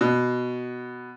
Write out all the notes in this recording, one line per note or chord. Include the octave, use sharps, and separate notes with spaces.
B2